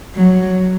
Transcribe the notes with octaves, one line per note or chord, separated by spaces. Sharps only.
F#3